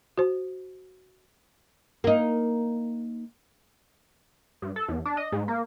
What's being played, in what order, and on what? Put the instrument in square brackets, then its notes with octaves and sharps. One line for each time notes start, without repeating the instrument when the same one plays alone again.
[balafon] F#4 C5
[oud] A#3 D#4
[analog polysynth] G2
A4
E2
D4
D#5
G#2
A#3